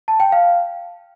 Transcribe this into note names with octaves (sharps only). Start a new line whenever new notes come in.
A5
G5
F5